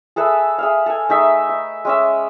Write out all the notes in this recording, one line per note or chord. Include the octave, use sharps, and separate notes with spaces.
G#4 A4 B4 E5
G#4 E5 F5
A4 G#5
A3 D#4 G#4 E5
E5
G#3 C#4 E5